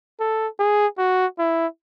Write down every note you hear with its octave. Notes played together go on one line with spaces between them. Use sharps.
A4
G#4
F#4
E4